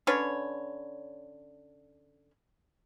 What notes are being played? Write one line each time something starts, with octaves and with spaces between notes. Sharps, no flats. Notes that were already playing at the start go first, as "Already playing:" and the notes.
D3 C#4 B4 C#5